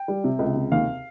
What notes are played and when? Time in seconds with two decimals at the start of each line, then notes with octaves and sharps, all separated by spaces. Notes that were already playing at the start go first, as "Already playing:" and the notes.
Already playing: G5
0.08 G3
0.24 C3
0.39 C#2
0.56 C3
0.71 D#2 F5